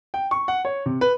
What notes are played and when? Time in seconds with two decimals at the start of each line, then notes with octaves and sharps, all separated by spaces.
0.14 G5
0.31 C#6
0.48 F#5
0.65 C#5
0.86 C3
1.01 B4